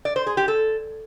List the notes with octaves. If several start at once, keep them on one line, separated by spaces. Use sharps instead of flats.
D5
C5
G#4
G4
A4